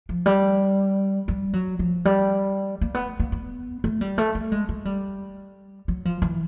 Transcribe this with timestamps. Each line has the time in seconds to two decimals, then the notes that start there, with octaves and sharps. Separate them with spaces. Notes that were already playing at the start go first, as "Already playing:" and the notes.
0.09 F3
0.26 G3
1.28 G3
1.53 F#3
1.79 F3
2.05 G3
2.81 A#3
2.95 B3
3.19 A#3
3.32 B3
3.84 A3
4.01 G3
4.18 A3
4.35 A3
4.52 G#3
4.69 G#3
4.85 G3
5.88 F#3
6.05 F3
6.22 E3